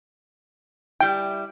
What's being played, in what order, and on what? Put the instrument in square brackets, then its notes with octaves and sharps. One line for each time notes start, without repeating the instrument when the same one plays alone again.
[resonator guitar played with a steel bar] G3 E4 [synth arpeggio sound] G5